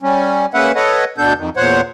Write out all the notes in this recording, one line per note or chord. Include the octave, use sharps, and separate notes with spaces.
G3 C#4
G#3 A#3 C#4 B4 E5 F#5
A4 B4 C#5 D#5 F#5
D2 B2 B3 D4 A4 G6
F2 D#3
E2 A#2 C5 C#5 F#5